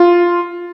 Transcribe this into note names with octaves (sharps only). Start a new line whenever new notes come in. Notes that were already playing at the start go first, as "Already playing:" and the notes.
Already playing: F4